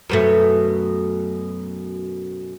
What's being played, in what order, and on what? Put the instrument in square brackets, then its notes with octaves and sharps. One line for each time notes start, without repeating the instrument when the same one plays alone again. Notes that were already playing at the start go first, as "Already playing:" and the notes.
[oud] F#2 B2 A3